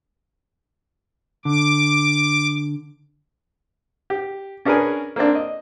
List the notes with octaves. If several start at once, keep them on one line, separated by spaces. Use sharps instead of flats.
D3 D6
G4
C#4 D4 G#4 A#4 B4 G#5
A#3 C4 D4
D#5